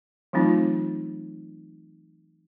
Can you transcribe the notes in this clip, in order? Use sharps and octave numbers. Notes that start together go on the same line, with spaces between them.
E3 F#3 A3 C4 D#4 F4